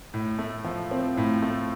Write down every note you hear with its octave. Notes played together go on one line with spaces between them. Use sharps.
A2
A3
F3
C4
A2
A3